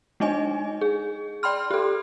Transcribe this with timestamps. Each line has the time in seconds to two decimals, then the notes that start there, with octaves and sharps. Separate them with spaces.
0.20 G#3 D4 D#4 D#5 G#5
0.81 G#4
1.43 D5 G5 B5 C6 F6
1.71 G4 A4